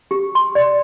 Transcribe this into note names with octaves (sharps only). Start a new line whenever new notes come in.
G4
C6
D5